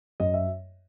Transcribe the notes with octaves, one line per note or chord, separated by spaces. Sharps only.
F#2 D#5
E5